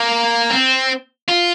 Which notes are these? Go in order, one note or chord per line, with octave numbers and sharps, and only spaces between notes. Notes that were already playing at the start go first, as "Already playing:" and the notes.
Already playing: A#3
C4
F4